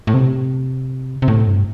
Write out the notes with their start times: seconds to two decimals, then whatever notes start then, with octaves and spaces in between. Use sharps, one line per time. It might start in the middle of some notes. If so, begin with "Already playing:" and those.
0.07 A2
0.14 C3
1.22 C3
1.28 A2
1.47 G2